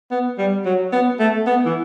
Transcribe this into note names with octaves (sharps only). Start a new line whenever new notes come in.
B3
G3
F#3
B3
A3
B3
E3